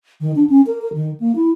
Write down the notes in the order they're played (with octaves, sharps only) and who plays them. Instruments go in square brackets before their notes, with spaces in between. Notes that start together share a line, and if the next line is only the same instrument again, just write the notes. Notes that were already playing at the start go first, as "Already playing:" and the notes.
[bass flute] D#3
D4
C#4
A#4
A#4
D#3
A#3
E4